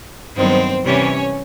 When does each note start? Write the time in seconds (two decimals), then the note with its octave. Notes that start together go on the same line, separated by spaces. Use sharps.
0.35 G2 D#3 F#3 B3 C4 C5
0.84 C3 E3 G3 C#4 C#5